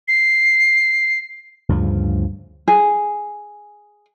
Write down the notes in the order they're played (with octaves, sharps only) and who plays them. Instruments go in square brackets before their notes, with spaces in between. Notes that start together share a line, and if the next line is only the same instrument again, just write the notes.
[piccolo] C7
[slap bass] D2 G2 C#3 F3
[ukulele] G#4